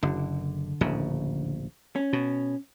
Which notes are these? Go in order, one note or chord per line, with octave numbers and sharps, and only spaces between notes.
F#1 D3
D1 A#1 C#3
C#4
B2